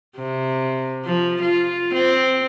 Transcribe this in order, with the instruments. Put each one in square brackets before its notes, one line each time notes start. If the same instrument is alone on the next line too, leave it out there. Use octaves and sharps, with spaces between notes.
[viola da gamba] C3
F3
F4
C4